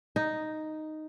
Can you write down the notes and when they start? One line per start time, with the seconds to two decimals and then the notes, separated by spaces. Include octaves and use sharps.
0.16 D#4